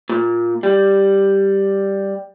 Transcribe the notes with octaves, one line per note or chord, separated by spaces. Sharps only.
A#2
G3